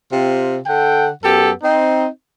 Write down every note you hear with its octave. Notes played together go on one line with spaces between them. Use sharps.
C3 C4 F4
D3 A4 F#5 G5
F#2 B3 G4 A4
C4 D#4